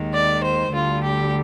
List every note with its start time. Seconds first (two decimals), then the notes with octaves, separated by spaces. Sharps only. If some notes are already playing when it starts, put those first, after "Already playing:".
Already playing: D#2 D#3 G#3
0.14 D5
0.44 C5
0.73 D2 D3 G3 F4
1.04 G4